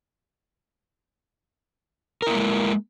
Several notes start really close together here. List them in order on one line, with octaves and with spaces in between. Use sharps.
A#4 E4 A#3 G#3